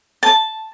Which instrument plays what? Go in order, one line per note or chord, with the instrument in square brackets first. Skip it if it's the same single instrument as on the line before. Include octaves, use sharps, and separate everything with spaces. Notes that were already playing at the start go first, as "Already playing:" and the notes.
[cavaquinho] A5